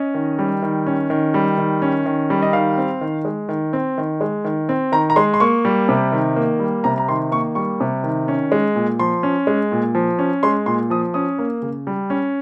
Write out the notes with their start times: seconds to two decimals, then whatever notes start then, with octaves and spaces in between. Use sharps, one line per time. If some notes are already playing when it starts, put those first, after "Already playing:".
Already playing: C#4 D#5
0.14 D#3
0.39 G3
0.62 D#3
0.86 C#4
1.10 D#3
1.34 G3
1.58 D#3
1.82 C#4
2.06 D#3
2.30 G3
2.42 D#5
2.53 D#3 F5
2.78 C4
3.01 D#3
3.25 G#3
3.49 D#3
3.73 C4
3.98 D#3
4.21 G#3
4.45 D#3
4.69 C4
4.92 D#3 A#5
5.10 A#5
5.16 G#3 C6
5.34 C6
5.40 A#3 C#6
5.65 G3
5.89 C3
6.12 D#3
6.36 A#3
6.60 G3
6.84 C3 A#5
6.98 A#5
7.09 D#3 C6
7.32 A#3 C#6
7.55 G3 C#6
7.80 C3
8.04 D#3
8.28 C#4
8.52 G#3
8.75 A#2
8.99 F3 C6
9.23 C#4
9.47 G#3
9.72 A#2
9.95 F3
10.19 C#4
10.43 G#3 C6
10.66 A#2 C6
10.90 F3 D#6
11.14 C#4 D#6
11.39 A#3
11.62 C#3
11.87 G3
12.10 C#4